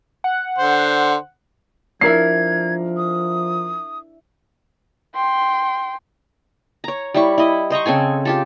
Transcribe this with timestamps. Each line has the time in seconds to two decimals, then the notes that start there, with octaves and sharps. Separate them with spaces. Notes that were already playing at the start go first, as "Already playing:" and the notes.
0.24 F#5
0.58 D3 C5
2.01 F3 D4 E4 A#4 G#6 C7
2.97 D#6
5.15 G5 C6
6.84 C#5 A#5
7.14 G3 E4 C#6
7.38 E4 D#5
7.70 C5 D#5 A#5 C#6
7.86 C#3 C4 A4 G#5
8.25 F4 G4 A4